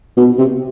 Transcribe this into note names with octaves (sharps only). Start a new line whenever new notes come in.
B2
C3